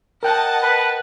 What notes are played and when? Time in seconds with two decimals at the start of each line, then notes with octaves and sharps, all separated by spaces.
0.23 A#4 D#5 F#5 G5 A5 F#6
0.61 B4